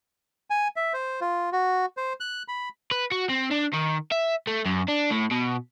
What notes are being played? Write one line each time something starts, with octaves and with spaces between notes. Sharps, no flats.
G#5
E5
C5
F4
F#4
C5
F#6
B5
B4
F#4
C4
D4
D#3
E5
A3
F#2
D4
A2
B2